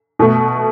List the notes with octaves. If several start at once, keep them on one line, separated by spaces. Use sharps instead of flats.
B2 A3